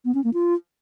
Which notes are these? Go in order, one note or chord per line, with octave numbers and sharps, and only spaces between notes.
B3
C#4
A#3
F4